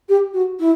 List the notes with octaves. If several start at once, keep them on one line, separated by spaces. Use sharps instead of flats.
G4
F#4
E4